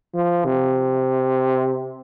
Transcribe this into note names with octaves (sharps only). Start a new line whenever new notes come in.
F3
C3